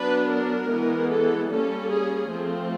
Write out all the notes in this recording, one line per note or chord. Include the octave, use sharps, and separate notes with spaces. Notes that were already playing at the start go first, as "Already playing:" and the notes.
Already playing: F#3 B3 D4 B4
A#4
E3 G#3 B3
A4
G3 A#3 C#4 A4
G#4
F3 A3 C4